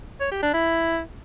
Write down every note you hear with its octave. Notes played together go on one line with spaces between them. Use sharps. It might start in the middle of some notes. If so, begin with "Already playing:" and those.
C#5
G4
D4
E4